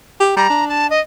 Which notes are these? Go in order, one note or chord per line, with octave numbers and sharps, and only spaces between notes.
G4
G3 A#5
D4
A5
D#5